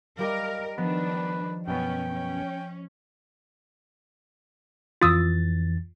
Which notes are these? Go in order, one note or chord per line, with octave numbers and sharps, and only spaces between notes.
G3 G4 A#4 D#5 F5
D#3 F3 B3 D4 B4
F#2 B2 B3 C#4 G5
C#4
F2 E3 F4 D#6 E6 A6